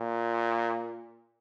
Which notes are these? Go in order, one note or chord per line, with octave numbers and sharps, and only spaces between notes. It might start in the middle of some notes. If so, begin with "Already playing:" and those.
Already playing: A#2